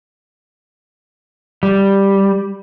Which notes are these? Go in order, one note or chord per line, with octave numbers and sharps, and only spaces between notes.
G3